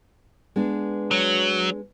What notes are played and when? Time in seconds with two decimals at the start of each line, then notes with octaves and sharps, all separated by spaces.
0.56 G#3 B3 D4
1.11 F#3